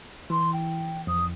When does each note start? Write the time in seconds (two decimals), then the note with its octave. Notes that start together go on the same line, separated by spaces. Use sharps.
0.30 E3 C6
0.52 G5
1.07 F2 D#6